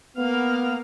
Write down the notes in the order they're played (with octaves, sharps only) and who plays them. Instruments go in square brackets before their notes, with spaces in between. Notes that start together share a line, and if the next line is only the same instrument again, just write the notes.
[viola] A#3 F5 [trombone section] B3